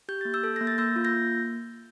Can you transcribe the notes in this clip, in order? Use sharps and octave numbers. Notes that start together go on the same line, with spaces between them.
G4 G6
A#3 A6
E6 G6
A4
A#3 A#6
A6
A#3 E6 G6
F4
G6 A#6
A#3